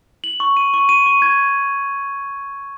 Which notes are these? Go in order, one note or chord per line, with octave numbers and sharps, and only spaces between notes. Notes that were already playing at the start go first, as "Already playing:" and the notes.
F#7
C#6
D#7
C#6
D#7
C#6
G#6